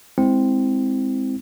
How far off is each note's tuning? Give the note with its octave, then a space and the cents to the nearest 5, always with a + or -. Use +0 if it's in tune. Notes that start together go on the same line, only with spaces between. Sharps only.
G#3 +0 C4 +0 E4 -10